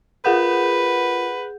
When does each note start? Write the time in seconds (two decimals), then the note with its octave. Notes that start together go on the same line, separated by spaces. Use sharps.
0.25 F4 G#4 A#4 B4 F#5 G6